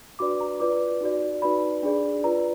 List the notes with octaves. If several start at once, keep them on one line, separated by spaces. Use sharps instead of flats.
D4 F#4 B4 D5 D6
A#5
F4 B4 D5 D6
D#4 F#4 D5
D#4 F#4 B4 D5 B5
D4 G#4 D5
F4 B4 D5 A#5